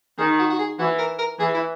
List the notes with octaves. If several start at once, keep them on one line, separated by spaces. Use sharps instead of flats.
D#3 G#4
F#4
F#4
G#4
E3 F#4
A#4
A#4
E3 G#4
E4